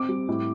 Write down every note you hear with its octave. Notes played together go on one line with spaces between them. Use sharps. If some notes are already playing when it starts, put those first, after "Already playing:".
Already playing: C4 D6
G3
A2